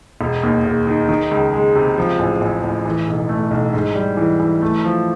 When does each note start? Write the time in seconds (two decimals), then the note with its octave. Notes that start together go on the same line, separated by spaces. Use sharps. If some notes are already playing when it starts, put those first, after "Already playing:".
0.21 E1
0.43 D#2
0.66 E1
0.87 D#3
1.09 D#3
1.31 C#2
1.53 G#3
1.75 C3
1.98 F3
2.19 A1
2.41 A1
2.64 A1
2.85 E3
3.08 B1
3.29 A3
3.51 B1
3.73 G#2
3.95 G3
4.17 E3
4.40 E3
4.62 A3
4.84 F3